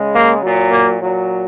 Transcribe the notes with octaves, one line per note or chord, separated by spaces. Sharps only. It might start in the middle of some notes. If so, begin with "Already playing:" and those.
Already playing: C#3 G#3
A#3
A#2 F#3
A#3
A#2 F#3